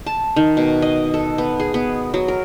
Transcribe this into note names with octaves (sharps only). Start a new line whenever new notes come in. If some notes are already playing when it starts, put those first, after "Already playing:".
A5
D#3
B2
D#5
A4
B3
G#4
B3
F#3
A#4